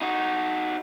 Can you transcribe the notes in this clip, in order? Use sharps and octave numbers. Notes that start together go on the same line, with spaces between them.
D#4 F#4